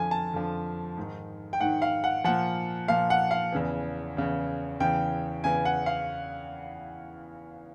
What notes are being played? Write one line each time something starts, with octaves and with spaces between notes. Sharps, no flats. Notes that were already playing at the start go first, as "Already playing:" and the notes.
Already playing: F2 D3 F3 G#5
A5
F2 D3 F3
G#2 D#3
G5
G#2 D#3 F#5
F5
F#5
A#2 F3 F#5
A#2 F3 F5
F#5
F5
E2 C#3 E3
E2 C#3 E3
E2 C#3 E3 G5
E2 C#3 E3 G#5
F#5
F5